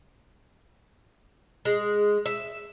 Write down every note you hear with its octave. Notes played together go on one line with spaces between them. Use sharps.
G#3
E5